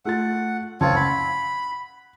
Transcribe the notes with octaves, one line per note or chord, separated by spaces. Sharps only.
A3 F4 F#5 A6
F#1 C#2 C4 F4 C#5 A5
F#5 B5